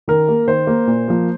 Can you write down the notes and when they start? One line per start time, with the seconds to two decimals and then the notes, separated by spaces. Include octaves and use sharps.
0.08 D#3 A#4
0.29 A#3
0.48 D#3 C5
0.67 A#3
0.87 A#2
1.08 F3 A#3